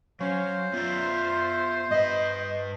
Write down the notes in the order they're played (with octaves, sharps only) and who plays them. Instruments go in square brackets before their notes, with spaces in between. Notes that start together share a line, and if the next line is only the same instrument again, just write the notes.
[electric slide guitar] F#3 [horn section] C#4 C#5 F5 [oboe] C5
[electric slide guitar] B3 D5 [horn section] F4 E5
[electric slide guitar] G2 B4 [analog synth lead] D#5